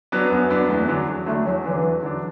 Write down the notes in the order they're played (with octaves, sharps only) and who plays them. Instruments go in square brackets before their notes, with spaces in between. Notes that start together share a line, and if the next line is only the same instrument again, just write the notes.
[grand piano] F#3 B3 D4
[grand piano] F#2 [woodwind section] B3
[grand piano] F#3 B3 D4
[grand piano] E2 [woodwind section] A3
[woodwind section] B3
[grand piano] D3 F#3 D4
E2
[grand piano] D3 F#3 D4 [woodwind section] A3
[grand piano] E2 [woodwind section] F#3
[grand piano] D3 F#3 D4 [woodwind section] E3
[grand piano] E2
D3 F#3 D4